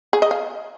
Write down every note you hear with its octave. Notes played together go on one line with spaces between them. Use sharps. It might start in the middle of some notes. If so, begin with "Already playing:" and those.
G#4
D#5
F5